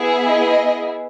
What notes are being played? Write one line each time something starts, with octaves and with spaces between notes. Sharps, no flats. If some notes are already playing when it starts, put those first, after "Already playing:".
Already playing: B3 E4 G#4
D#5